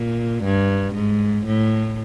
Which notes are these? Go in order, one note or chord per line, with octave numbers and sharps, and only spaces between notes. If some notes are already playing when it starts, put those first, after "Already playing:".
Already playing: A#2
G2
G#2
A2